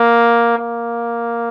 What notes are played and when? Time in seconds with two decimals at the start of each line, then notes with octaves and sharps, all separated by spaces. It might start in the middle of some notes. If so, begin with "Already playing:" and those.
Already playing: A#3
0.58 A#3